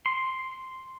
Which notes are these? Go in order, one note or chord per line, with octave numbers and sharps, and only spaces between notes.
C6